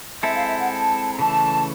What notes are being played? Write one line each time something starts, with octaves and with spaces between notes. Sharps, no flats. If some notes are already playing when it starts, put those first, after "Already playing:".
G#3 C4 E4 A4 E5
F5
E5
F#5
A5
A#5
C#3 E3 A3 A5